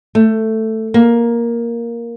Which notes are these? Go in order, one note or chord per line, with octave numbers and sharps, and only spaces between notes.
A3
A#3